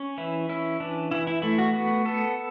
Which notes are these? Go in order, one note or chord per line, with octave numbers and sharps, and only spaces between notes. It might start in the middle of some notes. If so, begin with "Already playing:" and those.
Already playing: C#4
E3 E4
C#4 E4
E3 D4
E3 E4
E4
A3 E4
F#4
B3 F#4
B3 A4